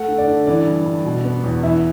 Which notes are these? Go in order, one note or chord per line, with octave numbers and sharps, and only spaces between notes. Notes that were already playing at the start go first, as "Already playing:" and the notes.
Already playing: A3 F#5
D3
D5
D3
E3 D5
G2
G2
B2
B3
E2
E3 E5